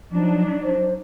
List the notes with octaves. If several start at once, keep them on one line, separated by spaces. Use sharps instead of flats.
F3 F#3 D4 D#4
C5